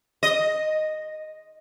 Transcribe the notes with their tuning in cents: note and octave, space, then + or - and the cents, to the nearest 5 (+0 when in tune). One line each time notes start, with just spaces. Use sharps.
D#5 -5